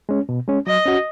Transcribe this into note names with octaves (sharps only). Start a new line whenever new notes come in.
G#3 C#4
B2
G#3 C#4
F#3 D#5
C#4 F#4